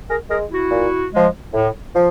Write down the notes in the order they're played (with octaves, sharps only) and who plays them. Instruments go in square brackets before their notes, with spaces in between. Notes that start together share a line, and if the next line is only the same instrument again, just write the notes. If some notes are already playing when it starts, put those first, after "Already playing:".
[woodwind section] G#4 A#4
G#3 G#4 A#4
E4 F#4
A#2
F3 G#3
A2
F3